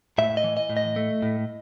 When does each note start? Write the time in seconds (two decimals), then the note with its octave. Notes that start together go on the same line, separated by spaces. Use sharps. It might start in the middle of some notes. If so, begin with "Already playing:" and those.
0.18 A2 E5
0.37 D#5
0.44 E3
0.57 D#5
0.70 A2
0.77 D#5
0.96 A3
1.22 A2